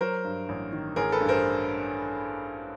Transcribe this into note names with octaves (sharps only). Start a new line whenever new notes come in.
F#3 A#4 C5
G2
A1
D#3
A1 G#4 A#4
A4 B4
G2
A#4 C5